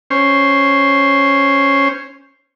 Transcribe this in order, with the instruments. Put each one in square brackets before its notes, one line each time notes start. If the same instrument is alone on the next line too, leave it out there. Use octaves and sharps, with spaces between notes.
[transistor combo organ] C#4 C5